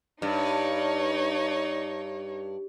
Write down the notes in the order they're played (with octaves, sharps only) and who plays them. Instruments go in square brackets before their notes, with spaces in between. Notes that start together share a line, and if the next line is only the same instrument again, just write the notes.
[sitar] G2 [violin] D#4 C#5